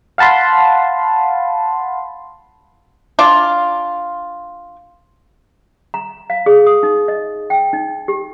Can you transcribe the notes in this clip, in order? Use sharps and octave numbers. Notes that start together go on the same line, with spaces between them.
F5 F#5 A5 B5 C6
D4 F4
A#5
F5
G#4
D#6
D#4
D#5
G5
D#4
G4